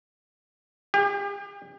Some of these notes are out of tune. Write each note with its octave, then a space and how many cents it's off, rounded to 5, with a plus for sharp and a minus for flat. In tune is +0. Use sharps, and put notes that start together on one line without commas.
G4 +40